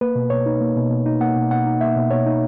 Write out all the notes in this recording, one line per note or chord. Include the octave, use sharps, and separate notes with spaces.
A#3 B4
B2
B2 C#5
D#4
A#3
B2
B2
D#4
A#3 F#5
B2
B2 F#5
D#4
A#3 E5
B2
B2 C#5
D#4